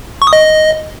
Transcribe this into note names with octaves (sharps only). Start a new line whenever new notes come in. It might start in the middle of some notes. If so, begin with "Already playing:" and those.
C#6
D#6
D#5